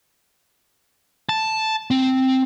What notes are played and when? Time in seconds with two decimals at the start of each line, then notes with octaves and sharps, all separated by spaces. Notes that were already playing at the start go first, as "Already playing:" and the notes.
1.29 A5
1.91 C4